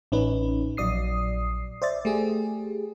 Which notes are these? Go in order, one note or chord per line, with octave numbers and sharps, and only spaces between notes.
A1 C#4 D#4 B4
A#1 F#3 D5 D#6 C7
C5 D5 E5 A6
A3 G4 G#4